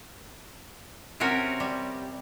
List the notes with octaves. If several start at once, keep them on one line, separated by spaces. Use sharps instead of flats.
C3 C4 C#4 F#4 A#4
G3